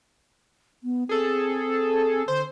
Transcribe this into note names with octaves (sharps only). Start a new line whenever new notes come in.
B3
C4 G#4 A4
D3 C5